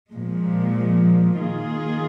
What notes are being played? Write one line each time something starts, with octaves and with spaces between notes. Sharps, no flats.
A#2 F3 G#3
D#3 A#3 F4 G#4